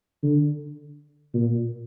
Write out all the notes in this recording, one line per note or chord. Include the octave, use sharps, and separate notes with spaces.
D3
A#2